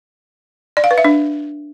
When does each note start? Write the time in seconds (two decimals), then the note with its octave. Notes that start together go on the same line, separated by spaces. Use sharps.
0.77 D5
0.84 F5
0.91 B4
0.98 E5
1.05 D4